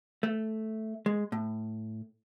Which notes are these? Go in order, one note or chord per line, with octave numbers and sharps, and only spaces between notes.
A3
G#3
A2